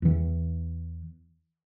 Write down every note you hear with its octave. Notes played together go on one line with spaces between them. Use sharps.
E2 E3